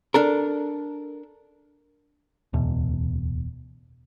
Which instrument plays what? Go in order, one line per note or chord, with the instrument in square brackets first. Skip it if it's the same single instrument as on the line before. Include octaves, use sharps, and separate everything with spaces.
[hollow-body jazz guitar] D4 A4 A#4
[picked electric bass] D1 E2 B2